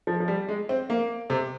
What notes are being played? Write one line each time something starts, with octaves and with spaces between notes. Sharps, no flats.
F3
F3
G3
G#3
C4
A#3
C3